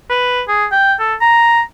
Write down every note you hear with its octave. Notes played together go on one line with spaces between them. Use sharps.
B4
G#4
G5
A4
A#5